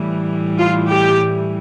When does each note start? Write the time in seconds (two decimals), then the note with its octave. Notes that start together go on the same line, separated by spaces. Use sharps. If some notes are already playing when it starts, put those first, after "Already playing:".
Already playing: A2 E3 G3
0.58 F4
0.89 G4